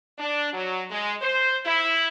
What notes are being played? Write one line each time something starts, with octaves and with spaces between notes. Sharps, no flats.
D4
F#3
G#3
C5
E4